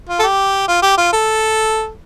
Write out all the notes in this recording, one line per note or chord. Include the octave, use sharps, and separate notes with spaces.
F4
A4
G4
F4
G4
F4
A4